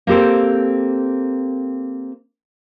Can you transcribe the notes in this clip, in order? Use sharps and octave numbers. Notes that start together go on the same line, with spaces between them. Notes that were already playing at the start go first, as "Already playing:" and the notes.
A#3 C4 G4 A4 C5